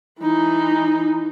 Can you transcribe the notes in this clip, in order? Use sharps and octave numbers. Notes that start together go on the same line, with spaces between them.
E3 D#4